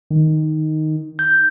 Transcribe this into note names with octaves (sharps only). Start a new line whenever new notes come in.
D#3
G6